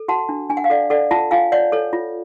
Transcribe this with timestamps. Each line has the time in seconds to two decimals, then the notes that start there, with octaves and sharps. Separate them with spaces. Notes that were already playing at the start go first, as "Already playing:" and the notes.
Already playing: A4
0.08 F#4 F#5 A5
0.29 D4
0.49 D4 G#5
0.57 F#5
0.64 F5
0.70 A4 D5 F#5
0.90 A4 D5 F#5
1.11 F4 F#5 A5
1.31 F4 F5 G#5
1.52 C#5 D5 F#5
1.72 A4 C#5
1.93 F4